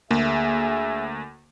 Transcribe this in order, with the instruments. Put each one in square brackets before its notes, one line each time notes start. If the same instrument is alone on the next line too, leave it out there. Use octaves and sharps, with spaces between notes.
[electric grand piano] D2 [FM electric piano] A#3 [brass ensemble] G#4 E5